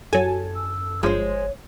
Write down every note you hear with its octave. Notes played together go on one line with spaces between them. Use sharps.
F#2 F#3 A4 G#5
E6
G1 G2 F3 G#3 C5 C#5